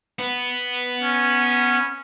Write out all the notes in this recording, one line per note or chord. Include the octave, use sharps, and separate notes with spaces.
B3 B4
C#4